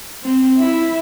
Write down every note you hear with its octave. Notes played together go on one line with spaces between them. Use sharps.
C4
E4